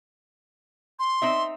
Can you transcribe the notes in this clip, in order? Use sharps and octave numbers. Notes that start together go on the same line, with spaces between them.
C6
C4 D#4 E5